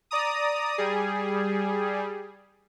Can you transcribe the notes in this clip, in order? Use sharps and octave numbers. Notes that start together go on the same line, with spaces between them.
D5 A#5 D#6
G3 G#4